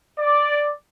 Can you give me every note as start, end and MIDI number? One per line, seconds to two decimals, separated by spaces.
0.18 0.69 74